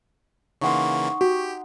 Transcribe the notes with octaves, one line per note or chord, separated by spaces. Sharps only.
C#3 E3 A#3 D#4 F#5 C6 C#6
F#4 G4